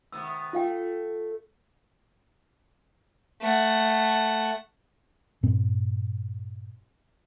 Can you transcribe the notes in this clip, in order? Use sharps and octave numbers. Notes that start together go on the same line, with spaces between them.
C3 D#3 B3 E6
A3 F4 F5 G5
A3 F#5
G2 A#2 C4